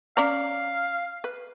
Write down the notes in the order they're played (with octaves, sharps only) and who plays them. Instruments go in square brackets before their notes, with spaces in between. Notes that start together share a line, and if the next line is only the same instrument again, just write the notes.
[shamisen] C#4 D5 A#5 [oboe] F5
[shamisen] B4